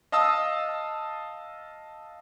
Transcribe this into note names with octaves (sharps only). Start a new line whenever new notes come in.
D#5 F5 A5 D#6 E6